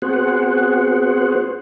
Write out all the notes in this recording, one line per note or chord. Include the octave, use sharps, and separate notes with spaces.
B3 C4 F#4 G#4 C5 F#5